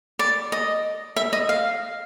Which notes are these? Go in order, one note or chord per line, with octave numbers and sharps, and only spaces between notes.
D5
D#5
E5
D#5
F5